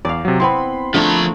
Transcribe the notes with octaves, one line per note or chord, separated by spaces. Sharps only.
E2 D5 F5
C3 F#3
B3 C4 E4 B5 C6
D3 F3 A3 A#5